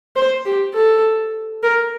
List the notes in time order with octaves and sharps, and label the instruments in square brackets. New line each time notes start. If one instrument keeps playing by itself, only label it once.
[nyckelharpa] C5
G4
A4
A#4